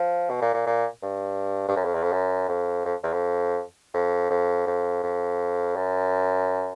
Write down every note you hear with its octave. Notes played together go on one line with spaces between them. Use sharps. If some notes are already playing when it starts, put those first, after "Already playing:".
Already playing: F3
B2
A#2
A#2
A#2
G2
G2
F#2
F2
E2
F2
F#2
F2
F2
E2
F2
F2
F2
F2
F2
F#2